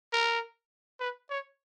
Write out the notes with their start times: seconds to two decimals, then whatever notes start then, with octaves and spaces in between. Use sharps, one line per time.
0.13 A#4
1.00 B4
1.30 C#5